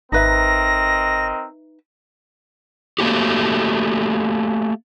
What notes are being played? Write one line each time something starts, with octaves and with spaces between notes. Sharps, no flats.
G#1 C4 D#4 A#4 B4 D#5 E5 A#6
A3 A#3 F#4 G4